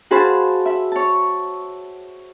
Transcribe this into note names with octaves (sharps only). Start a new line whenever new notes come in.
F#4 G#4 C5 F5 A5 B5
E5 B5
C#5 A5